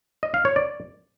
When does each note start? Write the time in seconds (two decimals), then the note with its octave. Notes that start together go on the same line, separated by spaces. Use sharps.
0.23 D#5
0.34 F5
0.45 C#5
0.56 D5